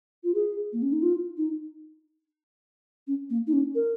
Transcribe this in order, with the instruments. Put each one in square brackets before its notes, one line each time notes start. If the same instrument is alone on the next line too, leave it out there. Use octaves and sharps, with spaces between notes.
[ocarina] F4
G#4
A#3
C#4
D#4
F4
D#4
C#4
A#3
D#4
C#4
A#4